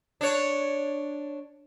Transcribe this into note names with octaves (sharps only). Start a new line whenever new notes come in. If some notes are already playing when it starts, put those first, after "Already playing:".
D4 C#5